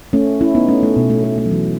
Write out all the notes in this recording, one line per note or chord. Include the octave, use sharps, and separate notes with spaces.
A3 C#4
C#4 E4
B3 D#4
A3 C#4
A3
B2
A3
A3
A3
F#3
E3